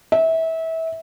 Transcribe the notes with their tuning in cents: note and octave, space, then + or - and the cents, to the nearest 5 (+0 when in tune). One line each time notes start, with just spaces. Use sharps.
E5 -25